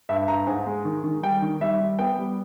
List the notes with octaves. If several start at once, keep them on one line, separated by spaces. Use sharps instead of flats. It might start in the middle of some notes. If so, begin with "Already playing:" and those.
G2 E5
G2 A#5
G#2 G#5
G#3
D#3
D#3
G3 G5
D#3
G3 E5
G3
B3 G5
G3